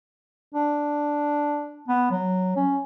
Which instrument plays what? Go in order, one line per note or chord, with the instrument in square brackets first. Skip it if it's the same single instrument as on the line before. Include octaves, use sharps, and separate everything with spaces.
[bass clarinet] D4
B3
F#3
C#4